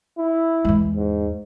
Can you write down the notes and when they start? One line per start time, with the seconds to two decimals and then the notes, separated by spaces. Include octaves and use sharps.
0.18 E4
0.65 E2 G#3
0.95 G#2